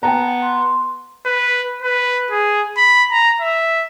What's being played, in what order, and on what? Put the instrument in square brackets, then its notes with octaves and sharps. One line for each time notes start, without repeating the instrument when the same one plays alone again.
[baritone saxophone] B3 [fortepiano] G5 A5 A#5
[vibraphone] C6
[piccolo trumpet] B4
B4
G#4
B5
A#5
E5